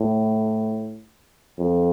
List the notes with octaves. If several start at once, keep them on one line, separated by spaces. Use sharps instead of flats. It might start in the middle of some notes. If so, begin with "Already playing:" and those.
Already playing: A2
F2